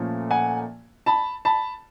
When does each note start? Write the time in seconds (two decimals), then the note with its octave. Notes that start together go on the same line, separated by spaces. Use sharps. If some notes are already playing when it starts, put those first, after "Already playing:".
Already playing: A#2 F3 A3 C#4
0.30 F#5 G#5
1.06 A5 B5
1.45 A5 B5